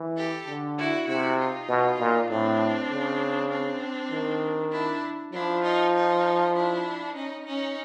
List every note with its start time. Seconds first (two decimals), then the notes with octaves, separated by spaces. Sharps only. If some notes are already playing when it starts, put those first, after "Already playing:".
Already playing: E3
0.17 G4 A4
0.47 D3
0.78 E4 F#4
1.07 C3 E4 F#4
1.38 D#4 F4
1.68 B2
1.99 A#2
2.29 A2 C4 D4
2.90 C#3
3.50 C4 D4
4.11 D#3
4.72 D4 E4
5.33 F3 D4 E4
5.63 D#4 F4
5.94 D#4 F4
6.54 D4 E4
7.15 C#4 D#4
7.45 C#4 D#4